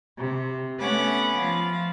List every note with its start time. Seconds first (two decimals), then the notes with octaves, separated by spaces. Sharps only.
0.17 C3
0.78 A3 B3 C#4 B4 F#5 D6
1.38 F3 F5